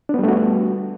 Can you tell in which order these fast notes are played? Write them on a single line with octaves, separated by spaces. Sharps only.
D4 B3 G3 A3 F#4